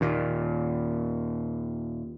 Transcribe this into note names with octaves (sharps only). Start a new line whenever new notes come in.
D#2 A#2